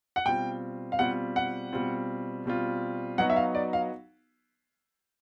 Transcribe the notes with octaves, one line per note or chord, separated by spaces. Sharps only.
F#5
B2 G3 C4 F4 G5
F5
B2 G3 C4 F4 F#5
F#5
B2 G3 C4 F4
B2 G3 C4 F4
F#3 B3 D#4 F#4 F#5
E5
F5
D5
F5